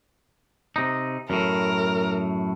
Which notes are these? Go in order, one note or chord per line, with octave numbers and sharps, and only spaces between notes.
C3 D#4
F#2 A2 A#4